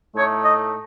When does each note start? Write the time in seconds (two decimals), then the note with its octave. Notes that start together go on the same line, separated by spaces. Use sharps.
0.15 A2 A3 D#4 C#5
0.43 D#5